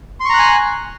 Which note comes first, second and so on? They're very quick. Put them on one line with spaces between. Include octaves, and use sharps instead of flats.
C6 C#6 A#5 F#6 G#5